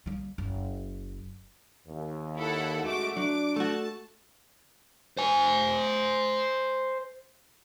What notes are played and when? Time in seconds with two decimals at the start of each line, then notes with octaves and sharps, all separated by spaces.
0.06 G3 A#3
0.38 F#1
1.87 D#2
2.36 E4 A4 F#5
2.83 F#2 G#3 A3 F#4 D6
3.17 F#3 D4 D6
3.56 A3 F#4 A5
5.17 C5 G#5